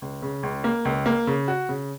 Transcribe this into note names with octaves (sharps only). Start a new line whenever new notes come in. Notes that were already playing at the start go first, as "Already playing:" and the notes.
C#2
C#3
C#2
A#3
C#2
A#3
C#3
F#4
C#3